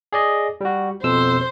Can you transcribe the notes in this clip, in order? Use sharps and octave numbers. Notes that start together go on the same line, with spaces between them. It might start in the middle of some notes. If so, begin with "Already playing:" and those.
G#4 D5 D#5
G3 F#4
F2 B2 C5 E6